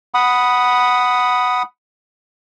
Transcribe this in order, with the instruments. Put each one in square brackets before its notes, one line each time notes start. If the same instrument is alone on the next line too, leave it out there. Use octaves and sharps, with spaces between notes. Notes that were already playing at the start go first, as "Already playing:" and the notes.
[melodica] F#5 B5 D#6